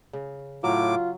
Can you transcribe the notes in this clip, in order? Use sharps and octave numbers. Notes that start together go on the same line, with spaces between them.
C#3
A2 F#3 F4 D6